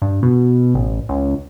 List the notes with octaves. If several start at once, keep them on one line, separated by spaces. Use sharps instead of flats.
G2
B2
A1
C#2